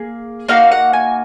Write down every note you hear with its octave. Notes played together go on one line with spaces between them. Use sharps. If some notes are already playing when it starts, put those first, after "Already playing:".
Already playing: A#3 G#4
A#3 D#4 F#4 F5
F#5
G#5